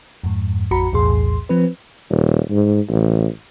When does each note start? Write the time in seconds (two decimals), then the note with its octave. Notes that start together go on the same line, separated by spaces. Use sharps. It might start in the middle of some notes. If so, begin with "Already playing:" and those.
0.24 F2 G#2
0.71 A1 F2 F#4 A#5 B5 C#7
0.92 B1 E2 A2 G#4 C6
1.49 F3 C4 B4
2.11 D#1
2.51 G#2
2.89 A1